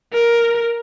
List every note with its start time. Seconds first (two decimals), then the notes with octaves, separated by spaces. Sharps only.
0.13 A#4